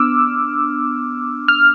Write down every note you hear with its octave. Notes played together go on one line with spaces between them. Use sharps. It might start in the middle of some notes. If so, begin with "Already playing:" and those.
Already playing: B3 D4 D6 E6 F6
F6